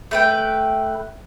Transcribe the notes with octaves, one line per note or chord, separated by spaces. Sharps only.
A3 B4 G5